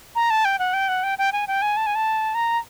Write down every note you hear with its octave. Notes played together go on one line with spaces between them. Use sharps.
A#5
A5
G5
F#5
G5
F#5
G5
G5
G#5
G5
G#5
A5
G#5
A5
A#5